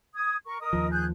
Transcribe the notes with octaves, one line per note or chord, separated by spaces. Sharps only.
D#6 G#6
A#4 C#6
A#4 D#5 D#6
D#2 F3
G#4 F#6 G6